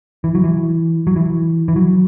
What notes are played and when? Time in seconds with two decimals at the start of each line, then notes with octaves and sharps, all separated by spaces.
0.24 E3
0.35 F#3
0.44 E3
1.07 F#3
1.16 E3
1.68 E3
1.76 F#3